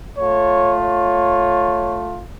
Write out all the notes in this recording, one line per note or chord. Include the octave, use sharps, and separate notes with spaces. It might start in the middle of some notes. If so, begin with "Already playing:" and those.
A3 F4 C#5
C#5